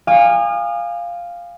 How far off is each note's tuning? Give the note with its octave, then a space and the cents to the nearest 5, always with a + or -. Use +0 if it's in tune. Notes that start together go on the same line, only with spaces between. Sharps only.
F5 +0 G#5 -30 D#6 -35